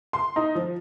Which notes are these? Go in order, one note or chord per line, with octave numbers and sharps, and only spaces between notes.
C6
D#4
F3